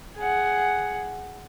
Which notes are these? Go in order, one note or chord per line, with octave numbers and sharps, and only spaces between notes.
G#4 F#5